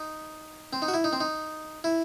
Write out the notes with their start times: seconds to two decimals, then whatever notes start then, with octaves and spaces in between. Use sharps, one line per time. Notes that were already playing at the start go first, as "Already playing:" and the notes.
Already playing: D#4
0.73 C4
0.82 D#4
0.88 F#4
0.94 E4
1.04 D#4
1.13 C4
1.21 D#4
1.84 E4